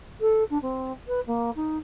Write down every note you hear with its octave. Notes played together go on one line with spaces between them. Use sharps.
A4
D4
C4
B4
A#3
D#4